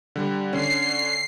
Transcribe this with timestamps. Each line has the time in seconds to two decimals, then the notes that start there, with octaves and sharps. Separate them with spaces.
0.16 D3 G3
0.53 D3 C#4 C7